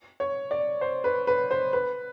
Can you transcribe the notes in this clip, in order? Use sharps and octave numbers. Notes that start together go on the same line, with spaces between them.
C#5
D5
C5
B4
B4
C5
B4